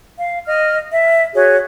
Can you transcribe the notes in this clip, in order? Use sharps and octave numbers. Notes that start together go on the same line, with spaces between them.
F5
D#5 F6
E5
F#4 G#4 C#5